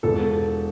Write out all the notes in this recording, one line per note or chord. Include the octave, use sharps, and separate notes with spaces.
E1 A4